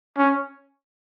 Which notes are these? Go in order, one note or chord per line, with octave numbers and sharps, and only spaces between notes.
C#4